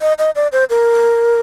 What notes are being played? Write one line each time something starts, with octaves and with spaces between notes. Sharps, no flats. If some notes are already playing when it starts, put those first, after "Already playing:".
D#5
D#5
D5
C5
A#4